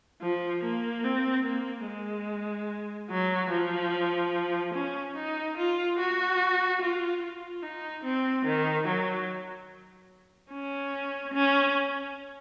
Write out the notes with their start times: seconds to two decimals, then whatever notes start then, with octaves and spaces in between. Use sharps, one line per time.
0.22 F3
0.63 A#3
1.04 C4
1.45 A#3
1.87 G#3
3.11 F#3
3.52 F3
4.74 C#4
5.16 D#4
5.57 F4
5.99 F#4
6.81 F4
7.22 F4
7.63 D#4
8.04 C4
8.45 D#3
8.88 F#3
10.52 C#4
11.34 C#4